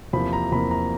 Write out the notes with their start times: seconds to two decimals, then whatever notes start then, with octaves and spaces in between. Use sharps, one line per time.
0.13 E2 C3 F3 A#3 B5
0.33 A#5
0.52 E2 C3 F3 A#3 B5
0.71 A#5